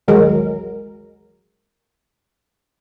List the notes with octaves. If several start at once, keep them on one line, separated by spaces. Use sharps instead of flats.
A1 D#2 F#3 G#3 A#4